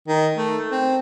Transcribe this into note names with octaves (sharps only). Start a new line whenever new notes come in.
D#3
A3
C4